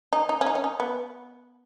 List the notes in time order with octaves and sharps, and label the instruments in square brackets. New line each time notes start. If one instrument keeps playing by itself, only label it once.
[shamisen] D#4
D#4
C#4
D#4
C#4
D#4
B3